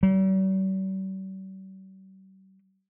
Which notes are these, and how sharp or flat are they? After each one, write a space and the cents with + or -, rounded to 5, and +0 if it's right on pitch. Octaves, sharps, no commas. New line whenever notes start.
G3 -45